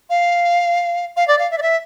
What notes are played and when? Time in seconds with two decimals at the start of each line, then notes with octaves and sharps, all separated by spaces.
0.10 F5
1.17 F5
1.28 D5
1.39 F5
1.51 E5
1.58 D5
1.62 E5